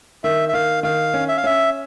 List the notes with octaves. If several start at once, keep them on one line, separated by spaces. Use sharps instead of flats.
D#3 E5
E5
D#3 F5
D#3 F5
C#4
E5
F5
C#4 E5